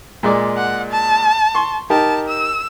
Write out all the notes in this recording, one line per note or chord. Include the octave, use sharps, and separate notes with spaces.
A#2 G#3 D5
F#5
A5
C6 C#6
D#4 G4 A#4 A5
E6